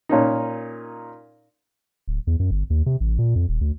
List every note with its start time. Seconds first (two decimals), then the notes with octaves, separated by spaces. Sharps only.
0.09 A#2 C#4 D#4
2.08 D1
2.27 E2
2.40 F#2
2.51 G1
2.70 D#2
2.86 C3
3.00 A1
3.19 A#2
3.35 F2
3.49 D#1
3.61 D2